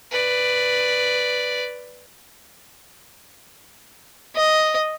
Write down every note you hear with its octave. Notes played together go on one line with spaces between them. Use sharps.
B4 D5
D#5